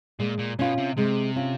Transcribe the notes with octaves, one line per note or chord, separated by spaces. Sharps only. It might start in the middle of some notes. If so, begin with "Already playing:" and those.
A#2 G#3
A#2
B2 C#4 F4
C3
C3 G#3
C#4 F4